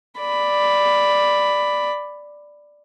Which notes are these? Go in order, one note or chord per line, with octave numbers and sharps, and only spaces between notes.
D5 B5